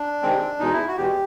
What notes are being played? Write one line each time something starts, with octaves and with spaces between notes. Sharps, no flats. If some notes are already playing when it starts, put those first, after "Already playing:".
Already playing: D4
C3 D#3 G#3 C4
E2 B2 G#3 D#4
E4
F#4
E2 B2 G#3 G4